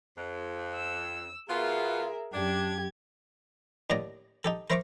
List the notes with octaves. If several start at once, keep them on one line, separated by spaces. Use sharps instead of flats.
F2
E6
B2 B3 F4 G#4 A#4 E5
F#2 D4 G4 G#6
D#2 A2 D3 D5 D#5 A#5
D#4 G4 A4
A#4 C5 E5 A#5 C#6 D6